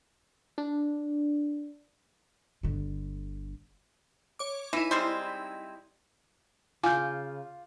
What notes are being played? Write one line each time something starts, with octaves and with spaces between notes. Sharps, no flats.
D4
G1 D3
C#5 D6
E3 D#4 E4
G3 G#3 C4
C#3 F4 G#5 D6 F6 G6